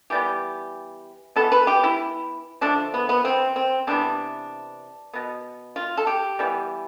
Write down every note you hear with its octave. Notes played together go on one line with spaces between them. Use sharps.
E3 G3 B3 G4
E3 B3 A4
B4
G4
E4
D3 F3 A3 D4
B3
B3
C4
C4
C3 E3 B3 D4
B2 B3
F4
A4
G4
E3 G3 B3